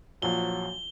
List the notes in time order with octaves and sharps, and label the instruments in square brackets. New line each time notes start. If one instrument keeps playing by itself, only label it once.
[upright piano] A#1 F3 [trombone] F#3 [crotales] G7